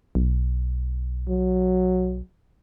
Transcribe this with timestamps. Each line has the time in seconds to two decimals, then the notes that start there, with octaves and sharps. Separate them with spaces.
0.15 B1
1.28 F#3